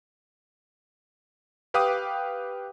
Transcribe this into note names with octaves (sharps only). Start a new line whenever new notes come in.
G4 B4 F5 G5 D6 D#6